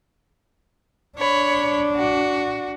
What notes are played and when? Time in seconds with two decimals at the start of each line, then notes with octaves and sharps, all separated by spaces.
1.18 D4 C#5 B5
1.96 F#4